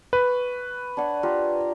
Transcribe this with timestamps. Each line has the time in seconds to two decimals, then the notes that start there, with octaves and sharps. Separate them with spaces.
0.13 B4 C#6
0.97 D4 C#5 F#5
1.23 F4 G4 A#4